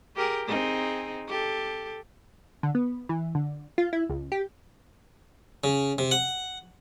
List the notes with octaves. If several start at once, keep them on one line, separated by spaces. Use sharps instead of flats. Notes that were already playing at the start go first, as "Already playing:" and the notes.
G4 G#4 A#4
C4 D#4 G#4
G4 A4
D3
B3
E3
D3
F4
E4
C#2
G4
C#3
C3
F#5